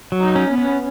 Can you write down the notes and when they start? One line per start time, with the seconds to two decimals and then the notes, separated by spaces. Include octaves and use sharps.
0.12 F#3
0.20 D#4
0.36 C#4
0.50 B3
0.58 C#4